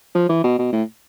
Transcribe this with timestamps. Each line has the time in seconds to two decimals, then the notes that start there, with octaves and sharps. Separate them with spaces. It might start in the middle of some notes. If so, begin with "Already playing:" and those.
0.15 F3
0.29 E3
0.44 B2
0.59 B2
0.73 A2